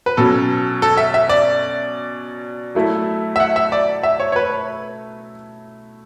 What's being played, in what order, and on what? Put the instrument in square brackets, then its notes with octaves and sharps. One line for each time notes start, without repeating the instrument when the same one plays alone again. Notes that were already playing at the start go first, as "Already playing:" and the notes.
[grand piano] B4
[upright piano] B2 F#3 C#4 [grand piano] A4
[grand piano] A4
E5
E5
D5
[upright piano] F#3 A3 E4 A4
[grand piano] E5
F#5
E5
D5
E5
C#5
C#5
B4